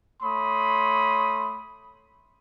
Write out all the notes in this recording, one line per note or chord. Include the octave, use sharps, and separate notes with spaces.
A3 C#5 B5 C6 D#6